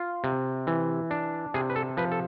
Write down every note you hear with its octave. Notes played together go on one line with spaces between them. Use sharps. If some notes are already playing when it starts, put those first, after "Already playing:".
Already playing: F4
C3
E3
D4
C3 G#4
B4
A4
F3 B4
A4